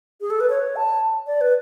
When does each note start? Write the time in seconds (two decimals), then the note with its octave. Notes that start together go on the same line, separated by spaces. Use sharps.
0.21 G#4
0.30 A4
0.40 B4
0.50 C#5
0.76 A5
1.27 D5
1.41 B4